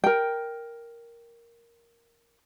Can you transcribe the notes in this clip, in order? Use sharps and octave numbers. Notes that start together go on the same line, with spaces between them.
A#4 G5